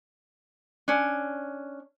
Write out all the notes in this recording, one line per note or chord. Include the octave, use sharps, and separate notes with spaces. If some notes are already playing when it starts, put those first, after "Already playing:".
C#4 D4